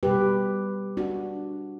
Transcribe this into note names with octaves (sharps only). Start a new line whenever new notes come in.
B2 G3 G4 B4
D4 F#4